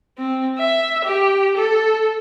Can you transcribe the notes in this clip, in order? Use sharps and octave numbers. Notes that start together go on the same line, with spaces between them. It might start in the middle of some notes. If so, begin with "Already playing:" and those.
C4
E5
G4
A4